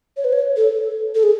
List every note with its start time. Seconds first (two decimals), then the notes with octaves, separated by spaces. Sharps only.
0.17 C#5
0.25 B4
0.33 C#5
0.57 A4
1.15 A4
1.23 G#4